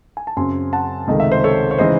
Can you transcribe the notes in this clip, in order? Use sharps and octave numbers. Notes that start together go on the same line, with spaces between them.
G#5
A5
F#2 C#3 F#3 C4 G#5 C6
F#5 A5
C#2 C3 D#3 A3 D#5
E5
C5 D#5
A4 C#5
C#5
C#3 E3 G#3 D#4 C5 D#5